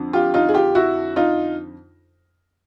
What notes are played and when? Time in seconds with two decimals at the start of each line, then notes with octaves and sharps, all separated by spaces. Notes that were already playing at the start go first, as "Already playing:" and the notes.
Already playing: F2 D3
0.13 F4 G4
0.34 D#4 F4
0.49 G#4
0.54 F4 G4
0.75 E4 F#4
1.16 D#4 F4